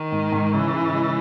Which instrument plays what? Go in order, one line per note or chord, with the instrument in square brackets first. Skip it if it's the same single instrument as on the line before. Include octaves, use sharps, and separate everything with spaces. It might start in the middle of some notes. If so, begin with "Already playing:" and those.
Already playing: [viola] D#3
[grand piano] G#2
G#2
[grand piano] C#3 [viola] E3
[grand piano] C#3
G#3